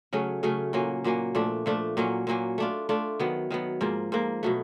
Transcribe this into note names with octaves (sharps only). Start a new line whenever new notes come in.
C#3 F#3 A3 C#4
C#3 F#3 A3 C#4
A#2 F#3 A#3 C#4
A#2 F#3 A#3 C#4
A#2 F3 A3 D4
A#2 F3 A3 D4
A#2 F#3 A#3 C#4
A#2 F#3 A#3 C#4
A3 D4 F4
A3 D4 F4
D#3 F#3 B3
D#3 F#3 B3
G#2 F3 A#3
G#2 F3 A#3
B2 F#3 A3